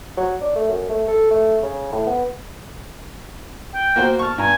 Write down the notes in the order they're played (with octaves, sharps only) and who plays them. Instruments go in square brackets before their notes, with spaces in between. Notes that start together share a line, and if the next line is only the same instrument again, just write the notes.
[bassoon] F#3
D4
A3
F#2
A3
A4
A3
C#3
A2
B3
[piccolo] G5
[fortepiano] A#3 F#4 C5
[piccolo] A5 [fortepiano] C#6 F6
[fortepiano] G2 A#5 [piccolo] G#5